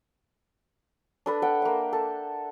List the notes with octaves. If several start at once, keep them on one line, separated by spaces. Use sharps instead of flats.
D4 A4 B4
A4 F#5 G5
A#3 E5
A4